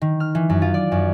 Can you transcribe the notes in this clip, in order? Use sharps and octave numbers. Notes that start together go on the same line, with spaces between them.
D#3
F6
E3
F#2
F4
D5
F#2